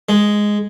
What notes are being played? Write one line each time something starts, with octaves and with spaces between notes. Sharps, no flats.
G#3